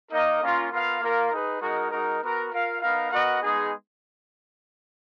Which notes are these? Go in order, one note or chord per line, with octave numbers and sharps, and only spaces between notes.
A#3 D#4 A#4 D#5
A#3 C#4 F4 A#4
B3 F4 A#4 F5
A#3 F4 A#4 F5
D#4 G#4 B4
G#3 D#4 F#4 A#4
G#3 D#4 F#4 A#4
B3 F#4 A#4
F4 A#4 F5
B3 D#4 A#4 F5
B3 F#4 A#4 D#5 F#5
G#3 B3 D#4 G#4